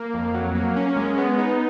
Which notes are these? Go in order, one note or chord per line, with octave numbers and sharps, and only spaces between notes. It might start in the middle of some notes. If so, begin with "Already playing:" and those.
Already playing: A#3
F2
F#3
A#3
C#4
G#3
B3
D#4